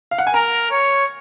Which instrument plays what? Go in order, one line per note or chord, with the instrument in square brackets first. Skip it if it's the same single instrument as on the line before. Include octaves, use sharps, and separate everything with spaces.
[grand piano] F5
F#5
G#5
[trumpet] A#4 [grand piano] A#5
[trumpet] C#5